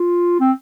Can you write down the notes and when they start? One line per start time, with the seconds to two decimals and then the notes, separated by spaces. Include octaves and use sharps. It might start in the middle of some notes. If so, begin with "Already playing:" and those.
Already playing: F4
0.40 C4